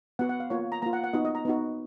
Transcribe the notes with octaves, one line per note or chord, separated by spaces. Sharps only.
B3 F#4 F#5
F#5
F5
A#3 F4 C#5
A#5
A#3 F4 A#5
F#5
F#5
B3 D#4 F#4 D#5
D#5
A#5
B3 D#4 F#4